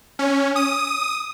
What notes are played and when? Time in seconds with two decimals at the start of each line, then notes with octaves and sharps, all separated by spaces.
0.19 C#4
0.56 D#6